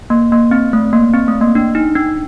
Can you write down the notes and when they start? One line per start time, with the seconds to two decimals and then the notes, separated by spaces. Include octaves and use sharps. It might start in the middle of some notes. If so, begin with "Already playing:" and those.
0.10 A#3
0.32 A#3
0.51 C4
0.73 A3
0.93 A#3
1.14 C4
1.28 A3
1.41 A#3
1.55 D4
1.75 D#4
1.96 D4